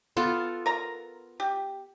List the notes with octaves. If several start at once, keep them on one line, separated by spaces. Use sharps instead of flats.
B3 F4 A4
A#4 A#5
G4